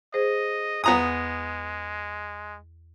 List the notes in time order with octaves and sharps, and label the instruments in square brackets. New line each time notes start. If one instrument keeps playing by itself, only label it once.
[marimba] G#4 C5 [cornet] D#5
[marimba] E2 [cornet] G#3 [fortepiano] B3 A#5 D#6